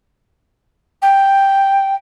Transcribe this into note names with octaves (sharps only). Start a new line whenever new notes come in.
G5